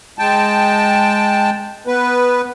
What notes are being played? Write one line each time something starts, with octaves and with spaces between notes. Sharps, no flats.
G#3 G5 A5
B3 B4